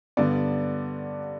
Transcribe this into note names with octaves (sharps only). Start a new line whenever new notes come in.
G2 D3 G3 B3 D5